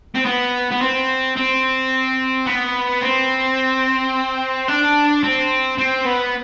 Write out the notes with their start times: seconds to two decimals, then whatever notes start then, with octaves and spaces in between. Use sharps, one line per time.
0.15 C4
0.25 B3
0.71 B3
0.81 C4
1.37 C4
2.46 B3
3.01 C4
4.68 D4
5.23 C4
5.78 C4
6.05 B3